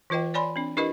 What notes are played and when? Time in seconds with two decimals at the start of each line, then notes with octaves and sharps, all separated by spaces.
0.10 E3 F4 B4 D#5 G5
0.34 C#5 D5 G#5 B5 C6
0.56 C4 D4
0.77 D4 E4 G4 A#4 B4 D#5